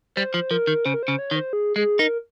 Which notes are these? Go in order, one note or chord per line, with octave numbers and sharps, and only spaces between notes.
G3 C5
F3
F3 A#4
D#3
C#3 C5
A#4
C5
C#3
C#5
D#3
C5
G#4
G#3 G#4
D#4 A#4